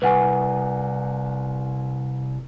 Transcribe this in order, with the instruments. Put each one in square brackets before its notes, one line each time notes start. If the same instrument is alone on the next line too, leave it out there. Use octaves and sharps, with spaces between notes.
[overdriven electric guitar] C2 [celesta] B4 F#5 G#5